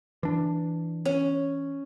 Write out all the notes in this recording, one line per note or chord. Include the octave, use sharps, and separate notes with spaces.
E3 D4
C#4